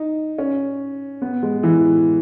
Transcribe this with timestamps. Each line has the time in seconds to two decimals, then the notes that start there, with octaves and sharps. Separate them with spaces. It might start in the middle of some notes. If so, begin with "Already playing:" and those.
Already playing: D#4
0.38 C#4
1.22 B3
1.43 G#3
1.63 E3